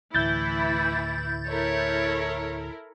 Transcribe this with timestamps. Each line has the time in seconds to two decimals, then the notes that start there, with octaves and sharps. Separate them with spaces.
0.15 D2 A2 E3 E4 G6 A6
1.49 E4 A4 A#4 C#5